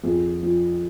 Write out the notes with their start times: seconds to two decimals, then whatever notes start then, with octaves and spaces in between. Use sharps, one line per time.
0.03 F2 G#4
0.43 F3